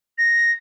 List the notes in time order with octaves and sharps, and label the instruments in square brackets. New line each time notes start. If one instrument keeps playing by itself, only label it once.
[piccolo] A#6